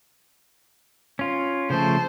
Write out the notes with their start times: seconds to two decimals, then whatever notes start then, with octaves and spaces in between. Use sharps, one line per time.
1.19 C#4 F4
1.70 C#3 F3 A3 C5 A5